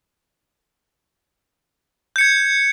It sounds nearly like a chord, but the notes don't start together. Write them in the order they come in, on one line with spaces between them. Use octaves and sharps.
G6 C#7 G#6